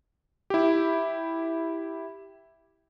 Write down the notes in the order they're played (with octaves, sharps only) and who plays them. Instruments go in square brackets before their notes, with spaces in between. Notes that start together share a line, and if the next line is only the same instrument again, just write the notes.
[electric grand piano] E4 G4